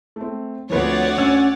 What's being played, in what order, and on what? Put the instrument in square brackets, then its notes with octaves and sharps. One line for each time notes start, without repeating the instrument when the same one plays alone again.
[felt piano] A3 C4
[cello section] D2 [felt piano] F3 C4 B4 [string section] C#5 D5 F#5
[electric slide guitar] C#4 [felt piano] E6